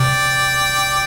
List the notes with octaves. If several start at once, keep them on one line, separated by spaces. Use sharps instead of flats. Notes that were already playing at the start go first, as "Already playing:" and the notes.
Already playing: C3 D5 G5